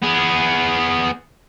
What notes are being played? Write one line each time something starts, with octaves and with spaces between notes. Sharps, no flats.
B3 G#4